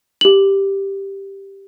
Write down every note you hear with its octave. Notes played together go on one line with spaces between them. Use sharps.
G4 F#7